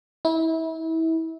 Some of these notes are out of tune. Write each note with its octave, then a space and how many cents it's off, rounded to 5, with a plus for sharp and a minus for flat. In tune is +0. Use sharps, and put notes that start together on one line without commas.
E4 -30